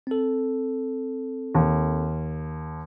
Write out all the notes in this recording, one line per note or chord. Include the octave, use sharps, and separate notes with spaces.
C4 A4
D#2